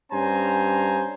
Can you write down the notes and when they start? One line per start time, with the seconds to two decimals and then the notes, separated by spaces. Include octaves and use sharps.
0.12 G2 C#4 C5 G#5 A#5